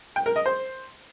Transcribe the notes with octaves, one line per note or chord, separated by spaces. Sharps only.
G5
A#4
D#5
C5